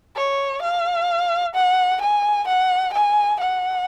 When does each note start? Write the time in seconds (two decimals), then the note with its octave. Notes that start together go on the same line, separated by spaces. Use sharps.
0.16 C#5
0.62 F5
1.55 F#5
2.01 G#5
2.48 F#5
2.93 G#5
3.40 F#5